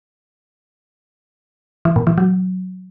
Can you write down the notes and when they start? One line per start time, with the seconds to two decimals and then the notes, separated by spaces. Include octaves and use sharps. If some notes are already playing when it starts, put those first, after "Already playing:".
1.85 E3
1.96 A#2
2.07 E3
2.18 F#3